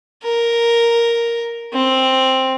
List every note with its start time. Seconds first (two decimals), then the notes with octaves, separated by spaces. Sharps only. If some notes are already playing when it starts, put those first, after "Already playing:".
0.24 A#4
1.74 C4